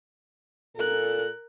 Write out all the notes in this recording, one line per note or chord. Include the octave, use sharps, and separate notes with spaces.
A#2 A4 A#4 F#6